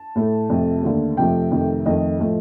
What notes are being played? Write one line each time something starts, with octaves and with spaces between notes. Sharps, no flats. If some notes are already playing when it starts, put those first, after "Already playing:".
Already playing: A5
A2 A3
F2 C3 F3 A3
D#2 D3 A3
F2 C3 F3 A3 G5
F2 C3 D#3 A3
F2 D#3 A3 D#5
A2 F3 A3